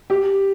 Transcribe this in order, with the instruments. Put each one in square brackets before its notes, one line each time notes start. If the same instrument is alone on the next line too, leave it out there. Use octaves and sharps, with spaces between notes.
[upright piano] G4